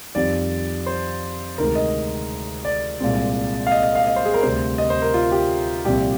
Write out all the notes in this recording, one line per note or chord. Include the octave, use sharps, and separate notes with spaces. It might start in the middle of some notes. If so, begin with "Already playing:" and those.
F2 D#3 G3 C4 D5
C5
D2 C3 D#3 G#3 A#4
D#5
D5
C2 A#2 G#3 C4
F5
D#5
D#5
F5
D#5
C5
G#4
A#4
D2 C3 G3 C4 C5
D#5
C5
A#4
F4
G4
C2 A#2 F3 C4 G4